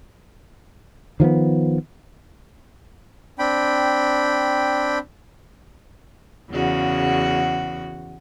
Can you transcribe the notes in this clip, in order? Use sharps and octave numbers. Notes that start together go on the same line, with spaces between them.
D#3 F3 A3 B3
C4 D4 G5 B5
E2 C#3 F#4